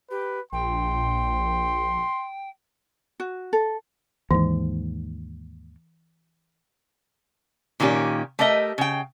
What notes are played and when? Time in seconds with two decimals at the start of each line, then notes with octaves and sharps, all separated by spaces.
0.10 G4 B4
0.52 A#1 G5 C6
3.20 F#4
3.53 A4
4.31 D#2 G#2 E3
7.80 A#2 D#3 A#3 C#4 G4
8.39 A3 G4 A#4 D#5 E5
8.78 C#3 G5